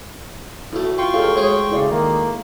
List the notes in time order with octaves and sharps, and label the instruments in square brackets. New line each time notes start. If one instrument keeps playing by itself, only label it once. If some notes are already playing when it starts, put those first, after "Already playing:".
[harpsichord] B1 A3 [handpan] E4 F#4
[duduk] F4 [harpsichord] B4 [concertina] G5 C6 C#6
[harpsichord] C#2 F#2 [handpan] G4 A4 F5
[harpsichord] D2 G#4 D#6 [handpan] G#3 [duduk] C#5
[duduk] C#3 [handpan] E4 D5
[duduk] D#3 [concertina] A#3